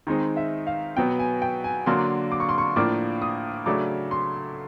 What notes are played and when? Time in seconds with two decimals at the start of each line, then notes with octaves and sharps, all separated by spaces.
0.07 D#3 G#3 C4 D#4
0.37 E5
0.67 F5
0.96 B2 F#3 B3 G5
1.19 G#5
1.42 G5
1.64 G#5
1.86 D3 F#3 A#3 D4 C6
2.32 D6
2.40 C#6
2.49 C6
2.58 C#6
2.76 A2 F3 A#3 D4 D6
3.22 D#6
3.66 C#3 F#3 A3 D4 D6
4.11 C6